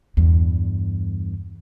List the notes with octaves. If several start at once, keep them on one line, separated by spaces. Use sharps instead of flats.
E2 G2